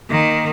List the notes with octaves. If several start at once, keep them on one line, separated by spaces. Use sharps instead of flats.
D#3 A#3 D#4